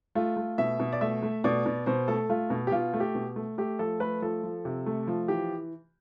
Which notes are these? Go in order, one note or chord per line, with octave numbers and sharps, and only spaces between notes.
A3 F4
A3
B2 E5
B2
D5
A3 E5
A3
B2 D5
B2
B2 C5
A3 A4
A3 F4
B2
G4
B2 F4
A3
G4
B2
A3
A3 G4
F3 A4
A3 B4
F3 A4
F3
C3
A3
F3
E3 G4